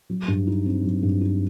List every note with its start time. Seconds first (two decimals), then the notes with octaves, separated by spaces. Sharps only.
0.10 F#3
0.28 G2
0.47 D#4
0.66 C4
0.84 F#3
1.03 G2
1.21 D#4